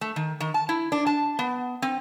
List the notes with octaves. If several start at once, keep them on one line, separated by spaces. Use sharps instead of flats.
A3
D#3
D#3
A5
E4
D4
A5
B3
C4